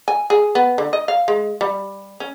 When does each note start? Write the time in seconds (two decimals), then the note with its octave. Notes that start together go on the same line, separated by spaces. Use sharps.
0.08 G#5
0.30 G#4
0.55 B3
0.78 D3
0.93 D#5
1.08 F5
1.28 G#3
1.61 G3
2.20 C#4